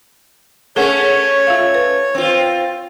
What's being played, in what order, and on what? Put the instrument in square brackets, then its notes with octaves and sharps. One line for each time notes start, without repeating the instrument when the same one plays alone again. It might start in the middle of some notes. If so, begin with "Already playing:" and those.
[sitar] A3 C#4 [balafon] G#4 A#4 F#5 [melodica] C#5
[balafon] F4 E5 F5
B4
[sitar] C4 F4